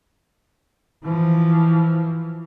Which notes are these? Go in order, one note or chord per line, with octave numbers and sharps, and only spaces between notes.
E3 F3